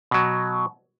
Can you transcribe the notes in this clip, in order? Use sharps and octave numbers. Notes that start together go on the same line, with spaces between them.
B2 F#3